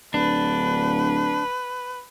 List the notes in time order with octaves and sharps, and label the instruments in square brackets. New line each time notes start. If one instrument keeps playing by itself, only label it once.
[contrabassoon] D1 [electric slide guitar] D4 [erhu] B4